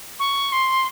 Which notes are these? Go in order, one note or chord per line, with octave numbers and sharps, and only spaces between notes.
C#6
C6